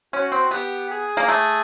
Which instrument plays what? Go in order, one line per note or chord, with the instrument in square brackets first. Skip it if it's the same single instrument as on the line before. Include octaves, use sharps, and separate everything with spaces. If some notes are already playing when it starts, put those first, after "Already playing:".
[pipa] C#4 [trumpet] F#4
[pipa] C4
[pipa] B3 [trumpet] G4
[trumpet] G#4
[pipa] A#3
A3